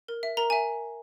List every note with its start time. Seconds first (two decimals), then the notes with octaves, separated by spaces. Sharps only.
0.08 A#4
0.23 E5
0.37 A#4 A#5
0.50 E5 G#5